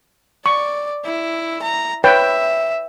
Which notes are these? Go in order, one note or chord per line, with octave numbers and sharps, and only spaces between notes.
D5 C#6
E4
A#5
B4 C#5 E5 G5